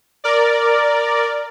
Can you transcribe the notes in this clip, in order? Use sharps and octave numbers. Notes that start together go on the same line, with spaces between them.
A#4 D5